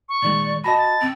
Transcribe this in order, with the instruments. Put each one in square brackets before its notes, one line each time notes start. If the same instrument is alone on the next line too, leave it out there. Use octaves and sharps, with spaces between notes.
[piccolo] C#6
[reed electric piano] A#2 D#3 G#3 [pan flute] D5
[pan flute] F#4 [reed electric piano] D#5 A5 B5 [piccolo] A#6
[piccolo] A6
[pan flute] C4